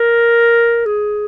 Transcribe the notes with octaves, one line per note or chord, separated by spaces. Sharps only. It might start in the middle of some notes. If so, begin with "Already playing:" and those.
Already playing: A#4
G#4